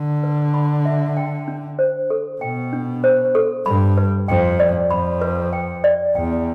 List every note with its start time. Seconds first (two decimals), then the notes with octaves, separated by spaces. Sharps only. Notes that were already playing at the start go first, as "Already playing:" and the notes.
Already playing: D3
0.23 B4
0.54 B5
0.85 E5
1.17 G5
1.48 D4
1.79 C5
2.10 A4
2.41 B2 G5
2.73 D4
3.04 C5
3.35 A4
3.66 G2 B5
3.97 B4
4.28 F2 G5
4.60 D5
4.91 F2 B5
5.22 B4
5.53 G5
5.84 D5
6.15 E2 G5